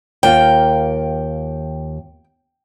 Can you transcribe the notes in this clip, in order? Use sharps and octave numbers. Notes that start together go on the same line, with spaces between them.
D#2 A#3 F4 G5